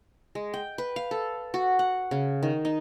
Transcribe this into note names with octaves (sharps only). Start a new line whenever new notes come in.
G#3
G5
B4
F5
A4
F#4
F#5
C#3
D#3
D#4